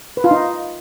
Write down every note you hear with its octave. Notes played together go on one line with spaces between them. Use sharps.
B4
F4
D#4